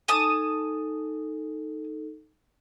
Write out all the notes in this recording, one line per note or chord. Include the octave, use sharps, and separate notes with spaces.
D#4 A4 G#5 A5 D#6